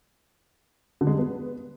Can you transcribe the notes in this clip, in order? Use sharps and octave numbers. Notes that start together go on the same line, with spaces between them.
D3
G#3
G3
B3